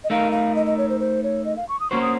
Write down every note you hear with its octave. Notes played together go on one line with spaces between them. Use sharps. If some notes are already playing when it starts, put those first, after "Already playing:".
D#5
A3 D#4 A#4 F5
F5
D#5
D#5
C#5
C5
C5
C#5
D#5
F5
C#6
D#6
A#3 C#4 F#4 C5 C#6
D#6